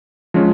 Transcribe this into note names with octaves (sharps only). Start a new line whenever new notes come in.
F3 G#3 C#4